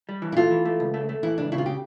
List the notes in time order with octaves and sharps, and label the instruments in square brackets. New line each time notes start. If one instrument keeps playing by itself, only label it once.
[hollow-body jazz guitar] G3
E3
[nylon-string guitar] E4
[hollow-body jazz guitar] A3 [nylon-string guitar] F4
[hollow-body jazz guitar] E3
A3
C#2
A3
A3
[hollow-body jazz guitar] E3 [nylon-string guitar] E4
[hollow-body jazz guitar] C#2 [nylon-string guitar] D4
[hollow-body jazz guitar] C#3 [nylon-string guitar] E4
[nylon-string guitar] F4
[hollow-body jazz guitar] C#3 [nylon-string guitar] G4